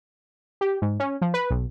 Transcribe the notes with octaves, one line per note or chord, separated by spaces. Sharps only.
G4
G#2
C#4
F3
B4
B1